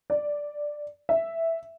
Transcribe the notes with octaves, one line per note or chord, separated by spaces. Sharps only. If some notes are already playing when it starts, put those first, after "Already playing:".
D5
E5